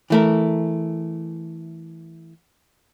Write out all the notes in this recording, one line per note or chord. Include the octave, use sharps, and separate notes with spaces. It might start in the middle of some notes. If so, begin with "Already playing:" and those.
E3 A3 A#4